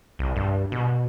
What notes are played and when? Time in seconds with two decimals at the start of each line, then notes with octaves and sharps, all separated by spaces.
0.19 C2
0.36 G2
0.72 B2